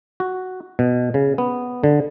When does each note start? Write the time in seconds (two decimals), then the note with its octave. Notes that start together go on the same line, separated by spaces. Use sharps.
0.20 F#4
0.79 B2
1.14 C#3
1.38 B3
1.84 D3